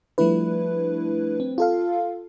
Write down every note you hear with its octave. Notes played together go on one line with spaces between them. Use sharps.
F3 G3 A3 D4 E4 B4
C4
F4 A4 F5